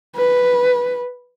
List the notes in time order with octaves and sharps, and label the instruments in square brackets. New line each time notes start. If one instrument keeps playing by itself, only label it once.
[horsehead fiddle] B4